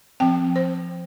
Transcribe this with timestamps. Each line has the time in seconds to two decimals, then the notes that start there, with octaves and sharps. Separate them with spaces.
0.20 F3 C4 G5
0.56 C5